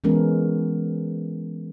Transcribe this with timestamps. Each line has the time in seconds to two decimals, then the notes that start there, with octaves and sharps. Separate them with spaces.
0.04 E3 G#3 B3 C#4 A#4